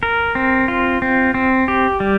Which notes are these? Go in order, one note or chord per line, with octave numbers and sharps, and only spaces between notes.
A#4
C4
F4
C4
C4
G4
G3